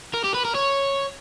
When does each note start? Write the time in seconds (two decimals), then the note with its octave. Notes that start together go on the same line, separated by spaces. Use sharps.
0.14 A#4
0.24 G4
0.34 B4
0.44 A#4
0.55 C#5